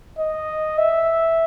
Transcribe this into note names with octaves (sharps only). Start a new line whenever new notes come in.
D#5
E5